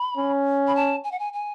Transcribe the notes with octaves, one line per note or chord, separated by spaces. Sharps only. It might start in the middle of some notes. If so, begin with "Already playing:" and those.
Already playing: B5
C#4
B5
A5
G#5
F#5
G#5
G#5